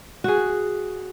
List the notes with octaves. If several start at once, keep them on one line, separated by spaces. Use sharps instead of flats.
F#4 G#4